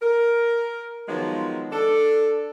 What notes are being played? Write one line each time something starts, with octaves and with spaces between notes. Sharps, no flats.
A#4
D#3 F3 F#3 G#3 B3
D4 A4